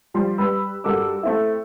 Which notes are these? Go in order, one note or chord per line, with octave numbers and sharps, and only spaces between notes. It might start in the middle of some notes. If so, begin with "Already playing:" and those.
F3 G3 C6
G3 B4 B5 E6
G2 F#4 A4 A#4 D6 E6
A3 C4 E4